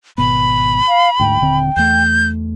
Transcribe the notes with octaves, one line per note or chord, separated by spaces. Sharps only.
G#1 B2 B3 B5
F5
D2 G#2 G5
D#1 D3 C4
E2 A3 G6